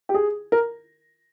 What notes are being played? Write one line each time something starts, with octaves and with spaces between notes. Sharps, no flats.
G4
G#4
A#4